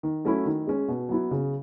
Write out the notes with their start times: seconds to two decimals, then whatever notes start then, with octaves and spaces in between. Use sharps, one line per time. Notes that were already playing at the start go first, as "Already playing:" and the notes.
0.03 D#3
0.25 F#3 A3 C#4 E4
0.46 D#3
0.67 G#3 C#4
0.88 B2
1.09 F#3 B3 E4
1.31 C#3